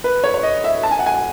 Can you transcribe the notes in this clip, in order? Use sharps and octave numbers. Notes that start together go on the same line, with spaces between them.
B4
C#5
C#5
D#5
E5
A5
G#5
F#5
G#5